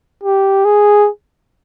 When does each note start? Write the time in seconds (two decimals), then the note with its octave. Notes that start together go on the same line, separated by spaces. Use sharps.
0.23 G4
0.65 G#4